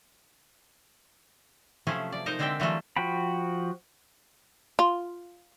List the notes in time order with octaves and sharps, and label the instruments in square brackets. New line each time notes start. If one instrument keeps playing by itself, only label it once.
[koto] C3 F3 F#3 A3 C#4 G#4
D5
D#4 A#4 C5 D#5
D3 G#3 C4 D5 E5 G5
E3 F#3 G3 A3 F4
[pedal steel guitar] F3 F#4 G5 B5
[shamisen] F4